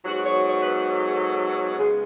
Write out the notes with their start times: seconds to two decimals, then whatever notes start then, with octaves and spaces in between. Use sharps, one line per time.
0.04 G#2 F#3 B3 F#4
0.26 C#5
0.47 C#5
0.62 B4
0.76 B4
0.90 B4
0.99 A4
1.07 G#4
1.15 A4
1.77 C#3 G#3 B3 G#4